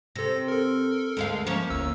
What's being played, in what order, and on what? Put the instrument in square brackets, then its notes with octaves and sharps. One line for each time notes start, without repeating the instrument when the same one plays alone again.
[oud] C3 [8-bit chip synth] A4 A#6
[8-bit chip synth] A4 A#4
[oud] D2 G#3 F5
[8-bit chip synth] F3 [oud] A#3 C#4
[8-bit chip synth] G1 D2 E6